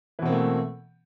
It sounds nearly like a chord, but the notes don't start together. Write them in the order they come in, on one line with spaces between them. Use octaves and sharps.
E3 B2 C4 A#3 A3